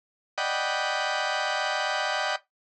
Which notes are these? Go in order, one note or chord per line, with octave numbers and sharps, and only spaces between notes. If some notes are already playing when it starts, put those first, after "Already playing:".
D5 D#5 F#5 G5 B5